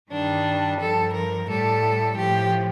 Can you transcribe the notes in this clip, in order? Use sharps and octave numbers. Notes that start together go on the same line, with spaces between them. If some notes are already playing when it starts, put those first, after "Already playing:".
G2 D#3 G3 D4
G2 F3 A4
A#4
A2 G3 A4
A2 F3 G4